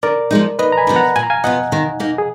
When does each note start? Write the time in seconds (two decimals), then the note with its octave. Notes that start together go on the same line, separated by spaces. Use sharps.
0.03 D3 A#4 D5
0.31 F3 G#3 D#4
0.59 D#2 B4 D#5
0.72 A#5
0.77 G#5 B5
0.87 D3 F3 B3
0.96 F#5 A#5
1.16 A#2 G#5
1.23 A#5
1.30 F5 G#5
1.44 F3 B3 F4 D#5 F#5
1.72 D#3
2.00 A#3 D#4
2.18 G#4